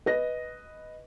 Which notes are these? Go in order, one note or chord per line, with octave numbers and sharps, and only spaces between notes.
B4 D#5 A#6